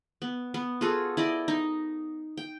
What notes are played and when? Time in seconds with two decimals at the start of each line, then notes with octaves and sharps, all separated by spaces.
0.22 B3
0.54 B3
0.81 F4 F#4 G#4 A4
1.17 E4 D5 D#5
1.48 D#4
2.38 G5